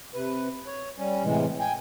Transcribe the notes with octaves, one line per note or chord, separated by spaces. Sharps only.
C3 B4
C#5
G3 C#4
A2 C3 E3 G#3
G5 G#5